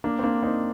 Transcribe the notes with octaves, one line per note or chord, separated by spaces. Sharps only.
A#3 D4
C4
A#3 D4
C4 D#4